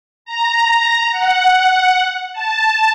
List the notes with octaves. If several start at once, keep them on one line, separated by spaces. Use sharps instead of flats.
A#5
F#5
A5